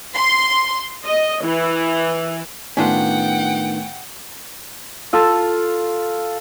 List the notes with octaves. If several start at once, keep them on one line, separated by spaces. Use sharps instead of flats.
C6
D#5
E3
A2 D#3 B3 C#4 D4 F4 F#5 G5
F4 A4